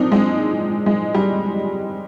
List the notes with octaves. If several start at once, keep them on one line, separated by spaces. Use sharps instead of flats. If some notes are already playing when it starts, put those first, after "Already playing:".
Already playing: A#2 F3 C4 D4 D#4
G#3 C4
G#3
G3